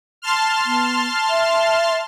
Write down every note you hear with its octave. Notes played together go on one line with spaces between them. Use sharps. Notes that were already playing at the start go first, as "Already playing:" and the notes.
A5 C6 F6
B3
E5